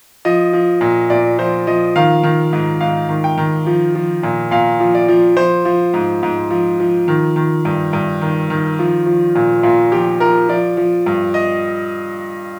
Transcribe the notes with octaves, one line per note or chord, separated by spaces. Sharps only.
F3 D#5
F3
A#2
A#2 D5
F3 C5
F3 D#5
D#3 F5
D#3
G#2
G#2 F5
D#3
G5
D#3
F3
F3
A#2
A#2 F5
F3
D5
F3
F3 C5
F3
G#2
G#2
F3
F3
D#3
D#3
G2
G2
D#3
D#3
F3
F3
A#2
A#2 F4
F3 G4
F3 A#4
F3 D5
F3
G2
D#5